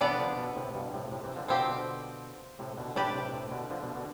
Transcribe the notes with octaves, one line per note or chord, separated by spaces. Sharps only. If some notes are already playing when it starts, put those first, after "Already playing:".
C3 E3 B3 D4 A4 D5
D3 F3
B2 D3
A2 C3
G2 B2
A2 C3
A2 C3
C3 E3
D3 F3
B2 D3 F3 C4 G4
B2 D3
A2 C3
B2 D3
A2 C3 D4 G4 B4 D5
A2 C3
A2 C3
B2 D3
D3 F3
B2 D3
B2 D3